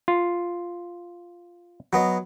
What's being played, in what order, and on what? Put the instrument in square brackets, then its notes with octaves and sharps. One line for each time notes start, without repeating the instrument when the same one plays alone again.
[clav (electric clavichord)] F4
[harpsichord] F#3 B3 D#5